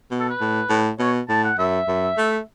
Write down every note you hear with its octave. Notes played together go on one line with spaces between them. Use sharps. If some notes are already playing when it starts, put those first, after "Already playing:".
B2
A4
B4
A2
A2
B2 C#5
A2 A5
F#5
F#2 E5
F#2
A3